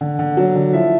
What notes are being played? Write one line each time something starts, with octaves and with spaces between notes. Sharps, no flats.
D3
D3
F#3
D3
F3 E4 E5